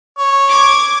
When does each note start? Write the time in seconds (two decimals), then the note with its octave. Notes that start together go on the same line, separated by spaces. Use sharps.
0.18 C#5
0.50 D6 G#6